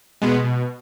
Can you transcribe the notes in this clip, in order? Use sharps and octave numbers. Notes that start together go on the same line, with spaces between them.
B2 G#3 B3
B2